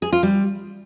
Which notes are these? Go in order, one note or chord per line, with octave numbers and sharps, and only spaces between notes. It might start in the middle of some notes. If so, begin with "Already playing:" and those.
G#4
F4
G3